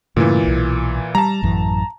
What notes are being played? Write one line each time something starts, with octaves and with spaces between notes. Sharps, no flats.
G2 A#2 C#3 E3 A3
D1 B1
G3 A5 A#5
A1 F#2 E3